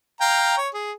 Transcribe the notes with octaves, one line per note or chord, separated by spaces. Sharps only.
F5 G5 A#5
C#5
G#4